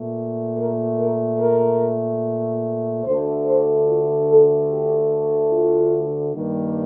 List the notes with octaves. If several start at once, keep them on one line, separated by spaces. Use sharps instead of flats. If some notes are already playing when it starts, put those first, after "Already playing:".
Already playing: A#2 A3
A#4
A#4
A#4
D2 D3 A3 C5
C5
F4
A4
G4
F4
G2 D#3 G3 A#3